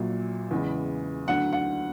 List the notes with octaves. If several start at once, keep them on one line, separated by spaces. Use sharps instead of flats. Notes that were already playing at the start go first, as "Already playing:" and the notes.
Already playing: A#1 A#2 F#3
E2 C#3 E3 G#3
D2 D3 F#3 F#5
F#5